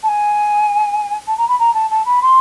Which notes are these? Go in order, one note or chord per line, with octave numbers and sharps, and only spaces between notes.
A5
G#5
A5
A#5
B5
A#5
A5
A5
B5
C6